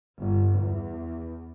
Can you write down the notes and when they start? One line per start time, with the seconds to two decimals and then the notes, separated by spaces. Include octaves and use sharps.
0.18 G1
0.59 E2